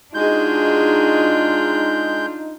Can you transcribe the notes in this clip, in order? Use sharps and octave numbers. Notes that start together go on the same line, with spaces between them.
G#3 D4 D#4 F4 F#4 G#4 G6